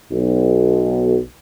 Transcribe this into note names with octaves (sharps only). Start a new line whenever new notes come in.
B1